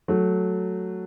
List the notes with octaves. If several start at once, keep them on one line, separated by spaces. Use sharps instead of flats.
F#3 A3